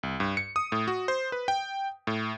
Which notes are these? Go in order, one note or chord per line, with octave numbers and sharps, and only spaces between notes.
C2
G2
C#7
D#6
A2
F#4
C5
B4
G5
A2